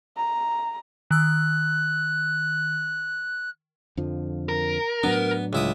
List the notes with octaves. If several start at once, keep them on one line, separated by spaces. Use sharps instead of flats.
A#5
D#3 E6 F#6
F2 D3 F3
A#4
A2 F#3 B3 D4
C#2 E4 D#6